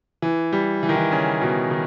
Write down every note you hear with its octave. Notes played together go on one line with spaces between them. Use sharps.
E3
G3
E3
D#3
E3
C#3
B2
D#3